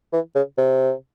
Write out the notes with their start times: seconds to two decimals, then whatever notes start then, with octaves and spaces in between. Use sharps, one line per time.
0.13 E3
0.35 C#3
0.58 C3